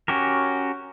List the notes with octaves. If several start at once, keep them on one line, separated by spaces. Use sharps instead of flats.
C#4 F#4 G4 A#4